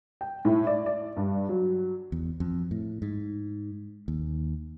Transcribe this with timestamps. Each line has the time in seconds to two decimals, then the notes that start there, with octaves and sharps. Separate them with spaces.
0.21 G5
0.45 A2
0.67 D5
0.86 D5
1.17 G2
1.49 F#3
2.12 E2
2.40 F2
2.71 A2
3.02 G#2
4.08 D#2